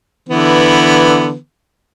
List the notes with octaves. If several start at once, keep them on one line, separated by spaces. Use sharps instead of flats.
D3 E3 B3